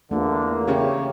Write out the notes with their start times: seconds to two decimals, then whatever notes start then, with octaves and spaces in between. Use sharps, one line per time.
0.11 E2 D3 A3 A#3 D4 F4
0.67 C#3 C#4 E4 G4 C#5